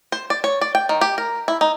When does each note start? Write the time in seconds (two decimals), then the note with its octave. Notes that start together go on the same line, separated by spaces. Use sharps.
0.12 C5
0.30 D5
0.44 C#5
0.61 D5
0.75 G5
0.89 D#3
1.01 G4
1.18 A#4
1.48 E4
1.61 D#4